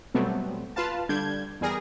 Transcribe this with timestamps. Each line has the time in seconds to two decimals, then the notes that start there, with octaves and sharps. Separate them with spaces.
0.14 B2 F#3 G3 A3 B3 C4
0.76 F4 B4 F5 A5
1.09 D3 G3 D4 G6 G#6
1.61 E2 G3 G#4 A#4 A#6